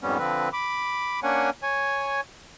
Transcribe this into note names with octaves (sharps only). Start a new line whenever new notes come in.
F2 G#2 G3 B3 C#4
D3 F3 C4 B4
B5 D6
A#3 C#4 D4 C#5 F#5 G#5
C#5 G#5